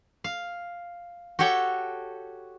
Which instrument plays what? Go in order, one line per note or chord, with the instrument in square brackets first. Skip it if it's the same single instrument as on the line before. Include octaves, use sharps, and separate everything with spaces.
[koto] F5
F#4 G4 A4 C#5 G5